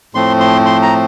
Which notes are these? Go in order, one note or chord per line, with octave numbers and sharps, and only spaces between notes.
A2 F3 A3 C4 C6
C6
C6
A#5